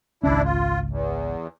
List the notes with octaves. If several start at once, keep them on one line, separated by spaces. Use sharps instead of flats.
G#1 C#2 C#4 D4 E4
F4
E2